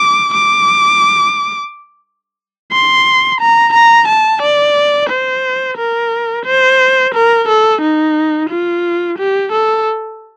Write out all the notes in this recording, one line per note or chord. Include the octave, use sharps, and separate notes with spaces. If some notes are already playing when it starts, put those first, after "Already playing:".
Already playing: D6
D6
C6
A#5
A#5
A5
D5
C5
A#4
C5
A#4
A4
D#4
F4
G4
A4